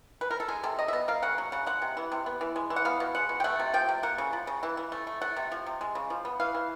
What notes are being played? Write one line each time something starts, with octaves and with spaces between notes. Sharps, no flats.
B4
A#4
A4
G#3 G#4
C3 A4
D#3 D#5
E5
B3 D#5
A#3 F5
C#3 F#5
F#3
C#3 F#5
G#3 F#5
C3
E3
C3
B3
E3
G#3
E3
F#5
B3 F5
B2
G#3 F#5
B2
G5
A3 F#5
C3
F3 G5
C3
A#3 F#5
C#3
F3
C#3
E3
E3
A3
A3
A3 F#5
C3
F3
C3
G#3
C#3
F3
B3
E3 F5
E3